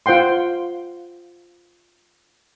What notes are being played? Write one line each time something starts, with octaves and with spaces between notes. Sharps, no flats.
F4 C5 F#5 G5 C6